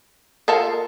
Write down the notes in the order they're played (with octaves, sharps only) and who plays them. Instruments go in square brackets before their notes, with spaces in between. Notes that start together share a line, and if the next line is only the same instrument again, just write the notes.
[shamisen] A#3 [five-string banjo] F4 A4 F5